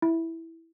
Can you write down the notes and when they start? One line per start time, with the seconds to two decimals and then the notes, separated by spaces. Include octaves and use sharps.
0.02 E4